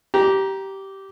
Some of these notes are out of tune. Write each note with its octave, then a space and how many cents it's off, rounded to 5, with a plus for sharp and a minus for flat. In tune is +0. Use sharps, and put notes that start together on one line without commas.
G4 -15 A#5 +15